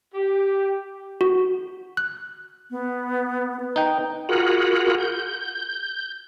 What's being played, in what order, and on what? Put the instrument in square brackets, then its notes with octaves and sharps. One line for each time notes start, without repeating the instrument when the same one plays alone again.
[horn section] G4
[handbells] F#4
F#6
[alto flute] B3
B4
[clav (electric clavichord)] D#4 G5
[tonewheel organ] F4 F#4 G#4 A#4 F#5 B5
G6